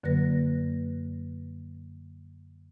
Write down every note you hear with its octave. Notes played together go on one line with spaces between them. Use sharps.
F#2 D3 F#3 A#3 B4 A#6